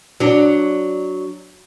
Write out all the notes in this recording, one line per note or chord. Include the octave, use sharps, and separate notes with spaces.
F#3 D4